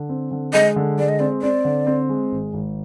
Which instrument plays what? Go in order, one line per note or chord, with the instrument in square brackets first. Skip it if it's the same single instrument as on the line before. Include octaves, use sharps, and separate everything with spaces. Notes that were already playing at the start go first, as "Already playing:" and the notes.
Already playing: [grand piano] D3
C4
D3
[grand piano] G#3 [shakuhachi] D#5
[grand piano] D3
[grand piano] G#3 [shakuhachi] D5
[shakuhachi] D#5
[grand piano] C4 [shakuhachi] D5
[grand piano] C4 [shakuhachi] D5
[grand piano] D3
C4
G#3
G#1
G#1